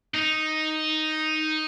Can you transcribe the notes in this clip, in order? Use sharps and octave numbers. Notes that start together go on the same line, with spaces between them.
D#4